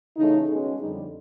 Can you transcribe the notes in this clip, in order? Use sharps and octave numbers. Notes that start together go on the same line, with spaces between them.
C#3 E3 A3 C#4 D#4
B2 G#3 C#4
F2 D3 G3 D#4